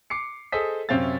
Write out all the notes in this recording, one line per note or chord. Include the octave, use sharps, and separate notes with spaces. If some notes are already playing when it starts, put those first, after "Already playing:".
D6 C7 C#7
G#4 A4 C5 D#5 D#6 B6
F#2 C3 C4 C#4 F5 A6